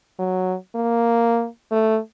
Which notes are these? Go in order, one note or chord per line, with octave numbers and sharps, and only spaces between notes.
F#3
A#3
A3